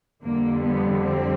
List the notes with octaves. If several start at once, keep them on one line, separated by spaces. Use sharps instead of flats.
F2 D3 G3 A#3
B3
C4